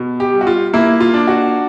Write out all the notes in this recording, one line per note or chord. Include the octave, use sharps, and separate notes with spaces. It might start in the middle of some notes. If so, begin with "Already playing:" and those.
Already playing: B2
G4
G3
F#4
F4
A#3 E4
F4
D4
F#4